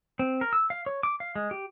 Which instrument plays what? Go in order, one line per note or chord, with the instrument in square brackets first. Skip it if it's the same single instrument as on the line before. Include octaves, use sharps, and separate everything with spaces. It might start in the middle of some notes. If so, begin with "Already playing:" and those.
[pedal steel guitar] C4
A#4
E6
F5
C#5
D6
F5
G#3
G4